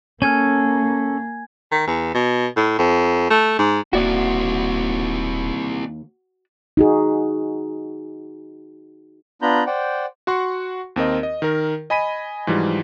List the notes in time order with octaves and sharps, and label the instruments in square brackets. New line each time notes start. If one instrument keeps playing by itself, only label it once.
[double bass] A#3 [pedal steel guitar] C#4 A4 F6 [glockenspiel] G#5 G#6
[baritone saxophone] D#3
E2
B2
A2
F2
A3
G#2
[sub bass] D#1 [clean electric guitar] D#2 A#3 F#5 [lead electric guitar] C4 E4 [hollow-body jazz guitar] F#4 D5
[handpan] D#4 F#4 G#4
[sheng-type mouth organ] B3 D4 F4 A#5 B5 G6
C5 D5 F#5 G5
[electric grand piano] F#4 F#5 C6 C#6
D#2 C4 A#4 D#5
D#5
D#3 A#4
D#5 G#5 B5 B6 D#7
G#2 E3 F3 G3